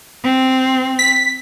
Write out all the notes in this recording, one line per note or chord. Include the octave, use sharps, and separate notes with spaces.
C4
B6